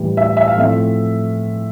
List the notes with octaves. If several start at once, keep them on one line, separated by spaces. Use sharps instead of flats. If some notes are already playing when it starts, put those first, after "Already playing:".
Already playing: A2 E3 G3
E5
E5
F5
A2 F3 A3 C4 E5